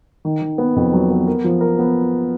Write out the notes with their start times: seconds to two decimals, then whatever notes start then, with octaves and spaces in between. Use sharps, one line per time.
0.25 D#3
0.42 D#3
0.58 B3
0.76 F2
0.93 F#3
1.11 B3
1.27 A#4
1.44 F3
1.61 A#4
1.79 B3